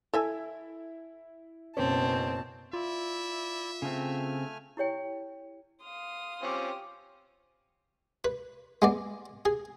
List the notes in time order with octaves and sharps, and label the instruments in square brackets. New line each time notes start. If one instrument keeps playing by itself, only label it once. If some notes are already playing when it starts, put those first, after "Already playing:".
[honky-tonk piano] E4 [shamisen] A4 E5 G#5
[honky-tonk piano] F#1 C#4 [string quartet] B2 A5 [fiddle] C4
[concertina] E4 D5 [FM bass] F4 [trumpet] E5
[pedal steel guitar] C#3 C4 [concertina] A3 G#5 F6
[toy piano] E4 G4 C#5 G5
[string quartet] F5 C6 D#6
[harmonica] C4 C#4 F4 [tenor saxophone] G4
[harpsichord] B4
G#3 B3 D5
G#4